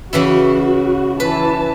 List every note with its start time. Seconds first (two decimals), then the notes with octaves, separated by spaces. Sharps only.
0.13 C#3 E3 E4 F#4
1.20 E3 B4 A5